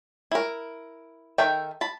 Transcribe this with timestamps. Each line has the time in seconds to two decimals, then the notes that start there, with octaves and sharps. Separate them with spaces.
0.31 E4 A#4
1.38 D#3 A4 A#4 E5 G5
1.81 A5 B5